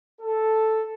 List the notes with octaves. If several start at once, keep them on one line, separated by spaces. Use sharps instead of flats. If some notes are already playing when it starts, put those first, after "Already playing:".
A4